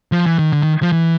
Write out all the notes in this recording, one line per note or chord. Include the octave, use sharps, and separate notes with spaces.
F3
E3
D#3
D3
D#3
F3
E3